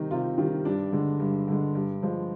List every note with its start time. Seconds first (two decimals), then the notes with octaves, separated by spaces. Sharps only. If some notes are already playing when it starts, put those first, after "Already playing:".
Already playing: C3 D#3 G3 D#4
0.11 C3 F4
0.38 D#3 G3
0.65 G2 D4
0.93 D3 G#3
1.20 G2
1.48 D3 G#3
1.75 G2
2.03 F3 G#3